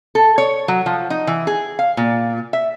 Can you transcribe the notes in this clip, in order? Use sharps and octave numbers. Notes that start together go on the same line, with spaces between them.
A4
C#5
F#3
F3
D#4
E3
G#4
F5
A#2
E5